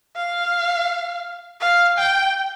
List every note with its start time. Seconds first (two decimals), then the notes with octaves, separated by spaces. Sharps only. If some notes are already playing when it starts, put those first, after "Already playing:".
0.16 F5
1.61 F5
1.98 G5